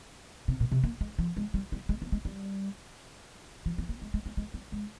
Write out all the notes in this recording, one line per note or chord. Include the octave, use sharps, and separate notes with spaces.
C3
A#2
C3
A#3
G#3
F3
G#3
G3
G3
G#3
A#3
G#3
G3
F3
F3
A#3
G#3
G#3
G#3
G#3
G3
G#3